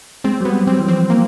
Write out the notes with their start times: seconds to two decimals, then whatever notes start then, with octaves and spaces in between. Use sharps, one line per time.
0.24 G#3 C4
0.41 F#3
0.45 G3 B3
0.67 F#3 C4
0.80 E3
0.88 F3 C4
1.10 A#3